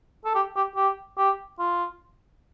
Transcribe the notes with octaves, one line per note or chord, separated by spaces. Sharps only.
A4
G4
G4
G4
G4
F4